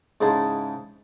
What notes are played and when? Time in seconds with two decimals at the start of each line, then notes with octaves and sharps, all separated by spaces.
0.21 G#2 C#3 D#4 E4 A5 C6